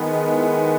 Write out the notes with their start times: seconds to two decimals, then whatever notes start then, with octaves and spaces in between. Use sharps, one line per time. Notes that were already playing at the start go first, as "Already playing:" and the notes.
Already playing: D#3 G#3 B3
0.31 E4